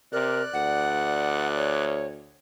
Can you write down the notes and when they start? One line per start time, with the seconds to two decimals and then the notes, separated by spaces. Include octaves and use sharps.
0.12 C3 A#4 D5 F#6
0.53 D2 F#5
1.57 C#5